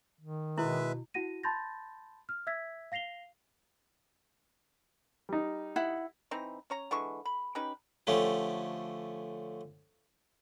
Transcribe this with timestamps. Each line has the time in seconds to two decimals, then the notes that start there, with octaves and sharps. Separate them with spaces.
0.21 D#3
0.58 B2 G#3 E4 B4 E5
1.14 E4 F#4 F#5 A#6 D#7
1.43 A5 B5 C6 G6 A6 A#6
2.29 F6
2.47 E5 E6 G#6 B6
2.92 F5 A#6 C7 F7 G7
5.29 G3 D#4
5.76 E4 F#5
6.31 E3 C4 D#4 A#5
6.70 C#4 C#5 A#5
6.91 D3 E3 G#3 C#6
7.25 B5
7.55 C#4 D#4 G4 B4
8.07 D3 F3 A3 C#4 G4